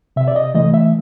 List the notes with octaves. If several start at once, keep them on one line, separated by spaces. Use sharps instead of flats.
C3 E5
D5
D#5
E3 A3 D#5
E5